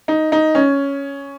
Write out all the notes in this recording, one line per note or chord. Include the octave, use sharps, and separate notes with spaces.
D#4
D#4
C#4